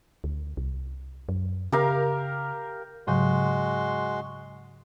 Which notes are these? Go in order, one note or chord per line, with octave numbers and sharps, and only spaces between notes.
D2
C2
F#2
C#3 G4 A#4 F5
G#2 C#3 F#3 G#3 F#4 C6